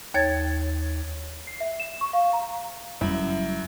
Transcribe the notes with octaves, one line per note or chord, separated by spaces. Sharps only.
D#2 C#5 G#6 A6
C7
E5
E7
C#6
F5
A#5
F#1 F#2 G3 E4